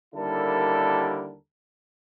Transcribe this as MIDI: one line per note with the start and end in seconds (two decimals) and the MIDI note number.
0.15 1.35 39
0.15 1.35 50
0.15 1.35 55
0.15 1.35 64
0.15 1.35 69
0.15 1.35 70